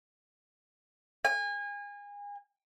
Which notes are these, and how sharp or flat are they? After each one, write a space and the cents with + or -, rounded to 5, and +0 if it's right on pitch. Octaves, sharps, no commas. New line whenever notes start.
G#5 -30